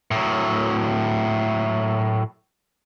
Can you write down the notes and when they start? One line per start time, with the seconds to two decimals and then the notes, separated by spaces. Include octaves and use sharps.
0.11 A2 F#3